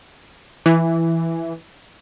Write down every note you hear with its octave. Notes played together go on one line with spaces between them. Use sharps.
E3